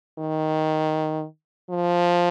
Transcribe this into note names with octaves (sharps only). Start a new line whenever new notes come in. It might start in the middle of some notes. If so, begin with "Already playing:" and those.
D#3
F3